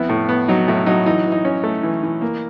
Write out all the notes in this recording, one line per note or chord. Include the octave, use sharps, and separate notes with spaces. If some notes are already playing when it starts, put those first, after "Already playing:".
Already playing: F2 B3 E4
A2
B3
F#3 D#4
A2 E4
F#3 D#4
E3 D#4
E3
D#4
C#4
A3
E3
E3
A#3